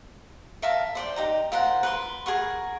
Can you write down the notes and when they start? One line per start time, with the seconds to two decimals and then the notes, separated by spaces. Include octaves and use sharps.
0.62 A#4 E5 F5 A5
0.95 C5 D5 G5
1.16 D#4 G4 A#5
1.52 F4 A#4 C5 F#5
1.83 B4 B5 C6
2.26 G#4 A#4 F#5 C#6